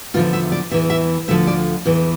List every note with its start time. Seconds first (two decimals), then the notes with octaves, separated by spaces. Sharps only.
0.14 E2 D3 F3 F4
0.33 E5
0.52 D5
0.71 E2 E5
0.74 E3
0.90 E5
1.28 D2 D3 F3 E5
1.47 D5
1.85 E2 E3